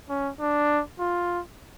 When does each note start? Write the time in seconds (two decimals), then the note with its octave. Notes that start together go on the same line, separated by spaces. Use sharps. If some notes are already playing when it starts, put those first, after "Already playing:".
0.09 C#4
0.40 D4
0.99 F4